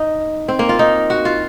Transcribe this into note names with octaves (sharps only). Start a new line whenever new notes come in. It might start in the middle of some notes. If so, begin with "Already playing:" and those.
Already playing: D#4
C4
A#3
F4
D#4
F#4
F4